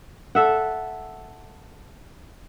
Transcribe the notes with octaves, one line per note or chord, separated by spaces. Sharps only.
A4 E5 F#5